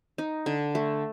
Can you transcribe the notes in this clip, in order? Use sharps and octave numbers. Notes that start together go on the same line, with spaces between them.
D#4
D3
A3